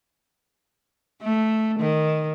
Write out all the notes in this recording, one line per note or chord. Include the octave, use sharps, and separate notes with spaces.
A3
D#3